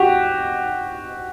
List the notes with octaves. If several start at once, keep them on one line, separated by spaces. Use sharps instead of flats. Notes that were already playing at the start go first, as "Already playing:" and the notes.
Already playing: F#4 G4